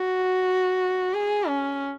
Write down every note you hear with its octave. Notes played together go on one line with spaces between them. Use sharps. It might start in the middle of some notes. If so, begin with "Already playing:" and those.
Already playing: F#4
G#4
C#4